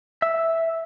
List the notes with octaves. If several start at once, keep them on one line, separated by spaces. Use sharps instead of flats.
E5